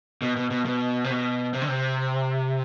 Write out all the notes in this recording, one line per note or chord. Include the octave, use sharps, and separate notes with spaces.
B2
B2
B2
B2
C3
B2
C3
D3
C3